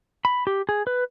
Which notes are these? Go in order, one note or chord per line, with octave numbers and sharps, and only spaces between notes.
B5
G4
G#4
B4